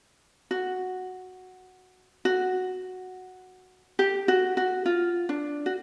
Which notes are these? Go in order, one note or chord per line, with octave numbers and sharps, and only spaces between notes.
F#4
F#4
G4
F#4
F#4
F4
D4
F#4